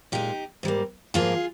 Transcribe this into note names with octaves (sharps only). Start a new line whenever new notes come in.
A#2 G#3 D#4 G4
G#2 G3 A#3
G#2 F3 A#3 F4 G#4